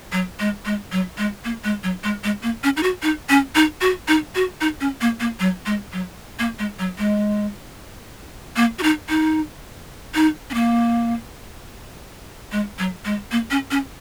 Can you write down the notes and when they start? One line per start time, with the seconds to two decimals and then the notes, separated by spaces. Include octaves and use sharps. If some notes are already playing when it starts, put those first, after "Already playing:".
0.12 F#3
0.40 G#3
0.65 G#3
0.92 F#3
1.18 G#3
1.45 A#3
1.64 G#3
1.83 F#3
2.04 G#3
2.24 G#3
2.43 A#3
2.64 C#4
2.77 D#4
2.83 F#4
3.02 D#4
3.29 C#4
3.55 D#4
3.81 F#4
4.08 D#4
4.35 F#4
4.61 D#4
4.81 C#4
5.01 A#3
5.20 A#3
5.40 F#3
5.66 G#3
5.93 F#3
6.39 A#3
6.59 G#3
6.79 F#3
6.98 G#3
8.56 A#3
8.79 F#4
8.83 D#4
9.09 D#4
10.15 D#4
10.50 C#4
10.54 A#3
12.52 G#3
12.79 F#3
13.05 G#3
13.32 A#3
13.51 C#4
13.71 C#4